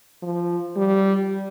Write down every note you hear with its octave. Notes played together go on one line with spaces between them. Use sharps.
F3
G3